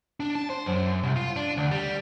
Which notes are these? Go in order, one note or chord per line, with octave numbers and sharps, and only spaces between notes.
D4
A5
C5
F#2
C2
F4
D4
D2
G3